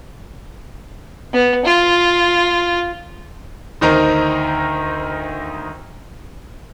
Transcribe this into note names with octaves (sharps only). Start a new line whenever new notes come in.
B3
F4
D2 D#3 D#4 A#4 C5 A#5